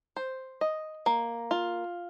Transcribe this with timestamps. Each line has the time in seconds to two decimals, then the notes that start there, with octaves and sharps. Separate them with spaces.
0.17 C5
0.61 D#5
1.06 A#3
1.51 F4